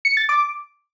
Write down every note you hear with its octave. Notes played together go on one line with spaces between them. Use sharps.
C#7
A6
D6